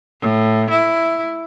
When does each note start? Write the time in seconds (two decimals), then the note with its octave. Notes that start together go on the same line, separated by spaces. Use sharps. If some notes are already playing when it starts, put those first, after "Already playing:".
0.22 A2
0.70 E4